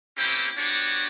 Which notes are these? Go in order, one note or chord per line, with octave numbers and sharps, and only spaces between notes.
A#3 C4 C#4 E4 G4
B3 D4 F#4 G4 C#5